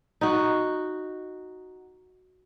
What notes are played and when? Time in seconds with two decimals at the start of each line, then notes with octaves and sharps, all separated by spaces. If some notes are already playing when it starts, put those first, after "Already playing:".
0.21 D#4 F#4